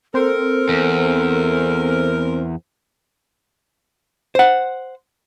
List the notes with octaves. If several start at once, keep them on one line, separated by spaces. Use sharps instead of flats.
A#3 C4 A4 A#4 C5
E2
C5 F#5